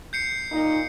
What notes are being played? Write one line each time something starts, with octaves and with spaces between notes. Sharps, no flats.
G6 C7 C#7
A#2 D#4